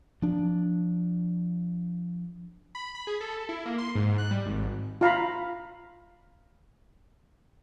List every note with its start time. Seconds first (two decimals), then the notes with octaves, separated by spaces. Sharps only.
0.22 F3 D4
2.75 B5
2.95 B5
3.07 G#4
3.21 A4
3.49 E4
3.66 A#3
3.78 C6
3.95 G#2
4.18 F#6
4.31 G3
4.46 G#1
5.01 F4 F5 A#5 B5